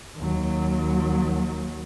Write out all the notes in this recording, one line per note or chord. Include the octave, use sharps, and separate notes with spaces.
D#2 F#3